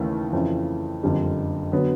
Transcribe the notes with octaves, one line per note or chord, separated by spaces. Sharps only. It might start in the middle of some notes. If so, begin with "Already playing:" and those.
Already playing: D#2 C#3 E3 A3
F2 C#3 E3
F#1 F2 D3 G3
D3 F#3 B3